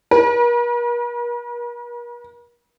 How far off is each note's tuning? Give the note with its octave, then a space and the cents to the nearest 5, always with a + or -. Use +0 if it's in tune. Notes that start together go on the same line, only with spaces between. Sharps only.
A#4 +45